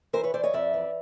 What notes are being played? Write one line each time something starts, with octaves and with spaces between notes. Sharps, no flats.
E3 A#4 C5
B4 C#5
E3 C5 D5
C#5 D#5
F2 D5 E5
E3